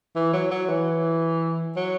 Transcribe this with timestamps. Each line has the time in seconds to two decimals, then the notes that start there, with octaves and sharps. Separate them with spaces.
0.16 E3
0.33 F#3
0.51 F#3
0.69 E3
1.76 F#3